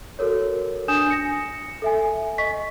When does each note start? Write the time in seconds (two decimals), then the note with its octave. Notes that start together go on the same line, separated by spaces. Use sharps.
0.19 F#4 A4 A#4 C#5
0.88 D4 G#5 D#6 G6 E7
1.10 A#6 C#7
1.82 A4 E5 G#5
2.38 D#5 C#6 B6